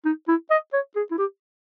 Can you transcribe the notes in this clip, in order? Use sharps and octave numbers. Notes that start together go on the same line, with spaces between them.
D#4
E4
D#5
C#5
G#4
E4
G4